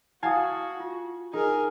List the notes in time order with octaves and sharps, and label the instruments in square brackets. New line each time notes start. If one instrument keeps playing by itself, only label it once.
[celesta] E4 F#5 D#6 [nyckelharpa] F#4 [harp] F5 G#5 A5
[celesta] F4
[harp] D#4 [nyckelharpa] G#4 A#4